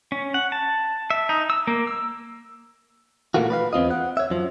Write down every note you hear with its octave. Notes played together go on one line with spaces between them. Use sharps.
C#4
F#5
A5
E5
D#4
E6
A#3
E6
A#2 E3 A3 A#3 F4 F#4
B4 D5 F5
E2 C4 F4 D#5
F#5
C#5 E5
F#2 F3